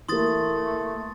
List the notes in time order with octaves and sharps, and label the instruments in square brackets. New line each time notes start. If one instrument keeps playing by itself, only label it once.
[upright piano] E3 A#3 [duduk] A3 [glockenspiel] C6 D#6 A6